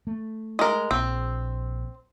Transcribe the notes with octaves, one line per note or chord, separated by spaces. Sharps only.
A3
G#3 A#4
A#1 C4